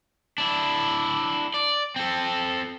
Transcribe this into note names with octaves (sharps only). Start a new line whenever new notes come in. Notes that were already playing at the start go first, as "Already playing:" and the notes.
D4 E4
D5
C4 A4